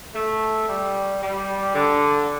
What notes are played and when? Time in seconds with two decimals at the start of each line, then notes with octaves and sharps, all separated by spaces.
0.15 A3
0.68 G3
1.22 G3
1.75 D3